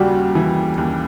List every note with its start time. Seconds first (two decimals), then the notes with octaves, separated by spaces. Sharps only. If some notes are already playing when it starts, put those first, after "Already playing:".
Already playing: D#2 C#3 G3 F#4
0.35 E3
0.78 D#2